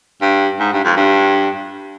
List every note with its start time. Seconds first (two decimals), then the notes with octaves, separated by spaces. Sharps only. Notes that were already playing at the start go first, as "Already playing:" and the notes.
0.22 G2
0.59 G#2
0.72 G2
0.84 F2
0.97 G2